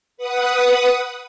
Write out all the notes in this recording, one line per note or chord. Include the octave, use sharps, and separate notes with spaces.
B4 F#5 D#6